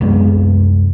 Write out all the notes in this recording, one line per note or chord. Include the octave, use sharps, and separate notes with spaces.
C2 F#2 G#3 B3